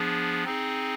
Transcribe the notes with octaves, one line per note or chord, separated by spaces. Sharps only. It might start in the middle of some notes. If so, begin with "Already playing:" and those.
Already playing: F3 B3 D4 G#4
C4 D#4 G#4